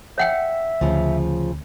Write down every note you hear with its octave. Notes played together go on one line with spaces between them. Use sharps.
C#5 E5 F#5 G5
D2 C#3 F3